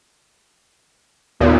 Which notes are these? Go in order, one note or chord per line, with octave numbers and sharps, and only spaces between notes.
D#2 A#2 B3